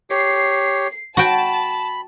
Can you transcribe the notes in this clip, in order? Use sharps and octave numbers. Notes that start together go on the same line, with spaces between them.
G4 C#5 C7
F#4 G5 A5 B5